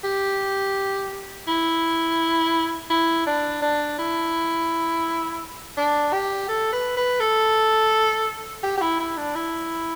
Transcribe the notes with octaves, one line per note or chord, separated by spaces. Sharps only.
G4
E4
E4
D4
D4
E4
D4
G4
A4
B4
B4
A4
G4
G4
E4
E4
D4
E4